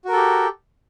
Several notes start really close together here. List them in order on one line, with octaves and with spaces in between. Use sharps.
F#4 A#4 A4 G4